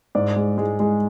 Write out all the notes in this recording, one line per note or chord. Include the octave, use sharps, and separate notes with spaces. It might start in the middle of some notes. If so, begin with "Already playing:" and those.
G#2 D5
G#3
G#3
G#3